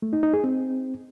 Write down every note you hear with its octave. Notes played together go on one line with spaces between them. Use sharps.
A3
D#4
D#4
G#4
C4